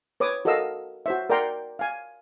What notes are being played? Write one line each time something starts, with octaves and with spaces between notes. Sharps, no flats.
B4 C#5 D6 D#6
F#4 A4 A#4 D#5 F5 E6
F#4 C5 E5
A#4 D5 F#5 G5 A#5 C6
F5 G#5